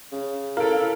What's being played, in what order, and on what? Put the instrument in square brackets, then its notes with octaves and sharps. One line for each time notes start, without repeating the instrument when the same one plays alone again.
[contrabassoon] C#3
[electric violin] E4 A4 [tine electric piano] A#4 [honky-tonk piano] F5 D7